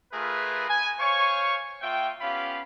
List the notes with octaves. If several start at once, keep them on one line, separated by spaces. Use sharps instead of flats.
A3 F4 G#4 A#4 B4
G#5
C5 C#5 F5 G#5 C#6
A#3 F4 E5 G5
B3 C#4 F4 G4 F5 B5